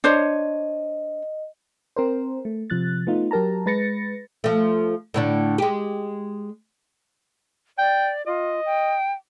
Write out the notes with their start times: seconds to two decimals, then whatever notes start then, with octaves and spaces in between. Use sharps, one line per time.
0.04 D4 C5 C#5 D#5
1.96 C4 A#4 C5
2.45 A3
2.70 C3 F3 F#6 A6
3.07 A3 B3 D#4 F4
3.31 F#3 G4 A#4 A5 A#5
3.66 G#3 B4 A6 A#6 C#7
4.44 F3 A3
5.14 A2 D3 D4
5.58 G#3 G4
7.78 D5 G5
8.26 F4 D#5
8.65 G5